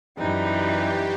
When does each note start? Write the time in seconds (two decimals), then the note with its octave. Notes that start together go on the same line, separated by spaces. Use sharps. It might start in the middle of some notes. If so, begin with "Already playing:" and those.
0.18 F#2 E3 G3 D#4 G4
0.78 F#4